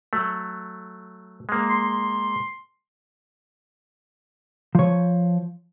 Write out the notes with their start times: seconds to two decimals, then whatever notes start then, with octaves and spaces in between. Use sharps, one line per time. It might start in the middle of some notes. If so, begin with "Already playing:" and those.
0.13 F#3 A3
1.49 G#3 A#3
1.70 C6
4.75 F3 C#5